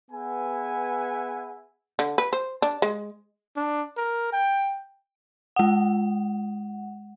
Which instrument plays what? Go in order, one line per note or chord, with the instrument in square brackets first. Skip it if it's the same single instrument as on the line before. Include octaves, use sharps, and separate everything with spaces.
[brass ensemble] B3 G#4 B4 E5 F#5 G#5
[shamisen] D3
B4
C5
D4
G#3
[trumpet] D4
A#4
G5
[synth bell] G#3 F#5